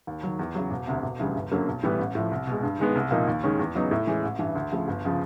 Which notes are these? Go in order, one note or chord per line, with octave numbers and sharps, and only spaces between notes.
D#2
D#3 F#3
E2
C#3 F#3
E1
D2 C3
E1
D2 C#3 E3 G3
G1
F#2 D3 F#3 A#3
B1
A2 E3 G3 B3
A1
A2 F3
C2
B2 G#3
G2
D#3 G#3 B3
C2
A#2 F3 A#3 D#4
D#2
D#3 G#3 C#4
E2
C#3 F#3 B3 D#4
A2
E3 G#3 C#4
A1
G2 E3
D2
C#3 F3 A3
G1
C#3 F3